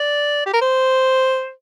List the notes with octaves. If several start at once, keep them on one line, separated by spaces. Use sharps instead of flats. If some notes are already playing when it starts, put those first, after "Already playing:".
Already playing: D5
G4
A#4
C5